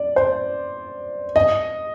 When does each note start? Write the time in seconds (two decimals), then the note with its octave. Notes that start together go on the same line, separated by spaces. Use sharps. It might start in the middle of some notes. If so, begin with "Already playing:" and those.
Already playing: D5
0.16 C5
1.36 D#5